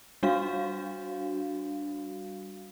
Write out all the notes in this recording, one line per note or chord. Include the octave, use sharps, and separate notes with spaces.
G3 D4 F#4 F5